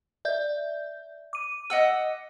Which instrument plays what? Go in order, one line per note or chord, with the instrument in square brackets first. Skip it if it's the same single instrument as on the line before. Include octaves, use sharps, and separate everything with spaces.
[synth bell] D5 E5 G6
D6 D#7
[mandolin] D#5 F#5 E6